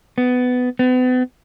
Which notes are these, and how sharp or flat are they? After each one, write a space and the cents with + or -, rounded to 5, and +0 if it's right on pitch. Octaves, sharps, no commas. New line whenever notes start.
B3 +15
B3 +40